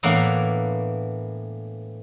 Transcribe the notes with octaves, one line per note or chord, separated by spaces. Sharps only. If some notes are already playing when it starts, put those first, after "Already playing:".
A2 E3 A#3 B3 D4